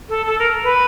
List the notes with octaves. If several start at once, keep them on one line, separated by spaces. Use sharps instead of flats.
A4
A4
A#4
B4